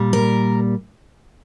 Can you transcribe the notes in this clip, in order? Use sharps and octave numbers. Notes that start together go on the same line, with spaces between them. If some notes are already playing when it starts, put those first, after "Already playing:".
Already playing: A#2 G3
A#4